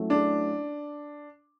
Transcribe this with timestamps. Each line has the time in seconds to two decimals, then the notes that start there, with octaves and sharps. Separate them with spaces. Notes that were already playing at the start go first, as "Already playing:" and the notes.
Already playing: F#3 A3 C#4 E4
0.10 D4